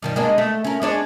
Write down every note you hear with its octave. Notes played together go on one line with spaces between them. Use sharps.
G2 D#3 G3
G#3 A#3 D4
A3
C#4 A#4
G#3 D4 C#5